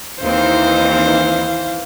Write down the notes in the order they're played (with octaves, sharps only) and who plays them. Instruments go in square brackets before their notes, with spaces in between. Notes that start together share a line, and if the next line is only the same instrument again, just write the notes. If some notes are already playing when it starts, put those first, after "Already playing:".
[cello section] D#2 C4 D#4 [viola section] E3 [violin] C5 [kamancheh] F5